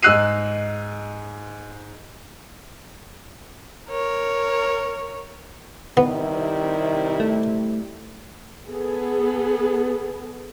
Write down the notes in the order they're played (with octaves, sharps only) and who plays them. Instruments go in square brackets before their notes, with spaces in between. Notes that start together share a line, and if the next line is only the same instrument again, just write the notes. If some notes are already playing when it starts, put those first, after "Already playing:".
[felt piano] G#2 D#4 E6 F#6 C7 D#7
[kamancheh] A#4 C#5
[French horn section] C3 G3 E4 [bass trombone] D#3 [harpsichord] B3
[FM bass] A3
[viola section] B3 G#4 A4